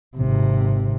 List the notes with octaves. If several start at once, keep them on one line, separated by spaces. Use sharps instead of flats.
G#1 C3